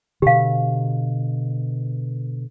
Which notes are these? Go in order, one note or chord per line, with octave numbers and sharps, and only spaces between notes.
B2 D3 G4 F5